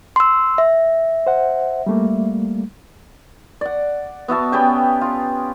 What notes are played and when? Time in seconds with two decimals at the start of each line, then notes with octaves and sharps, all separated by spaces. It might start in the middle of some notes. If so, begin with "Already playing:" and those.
0.16 C6 E6
0.58 E5
1.26 C5 F#5
1.86 G3 A3 A#3
3.61 D5 F#5
4.28 B3 F#4 E5 A5
4.52 B3 C#4 G4 G5
5.01 F4